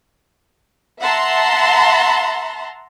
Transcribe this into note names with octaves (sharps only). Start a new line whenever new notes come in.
E5 F#5 A5 A#5 C6